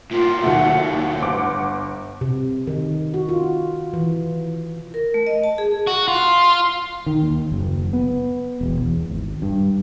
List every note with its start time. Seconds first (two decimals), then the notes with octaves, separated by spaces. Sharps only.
0.11 A2 A#3 F4
0.43 D#2 F#3 A3 F#5
0.89 F#5
1.22 G1 D6
2.21 C3
2.67 D#3
3.14 F#4
3.29 F4
3.94 E3
4.94 A#4
5.14 A3
5.27 D#5
5.44 A5
5.58 G#4
5.87 F#4
6.08 F4
7.06 D#3
7.23 D#2
7.52 F#1
7.93 B3
8.61 E1
8.81 E2
9.10 G#1
9.42 G2